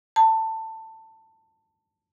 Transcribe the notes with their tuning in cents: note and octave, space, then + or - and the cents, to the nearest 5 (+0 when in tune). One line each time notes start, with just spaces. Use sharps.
A5 +20